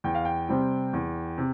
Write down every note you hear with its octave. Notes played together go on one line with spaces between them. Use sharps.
E2 G5
F5
G5
C3 G3 C4
E2
C3